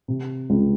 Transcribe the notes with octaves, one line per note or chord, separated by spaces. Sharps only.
C3
C#2